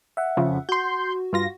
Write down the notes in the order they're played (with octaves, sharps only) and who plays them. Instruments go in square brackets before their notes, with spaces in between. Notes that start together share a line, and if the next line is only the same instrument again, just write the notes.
[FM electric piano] E5 F#5
[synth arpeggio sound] F2 C#3 F3
[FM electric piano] F#4 [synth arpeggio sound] C6 G6
[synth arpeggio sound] G2 F4 A#6